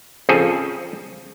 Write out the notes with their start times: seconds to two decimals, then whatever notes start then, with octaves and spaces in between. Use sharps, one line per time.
0.29 C#3 F3 C4 G#4 A4